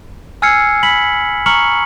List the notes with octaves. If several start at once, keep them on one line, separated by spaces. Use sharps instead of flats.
G#5 E6 F6 G#6 C7 C#7
B5 B6 F#7
A#5 C#6 F6 C#7 F#7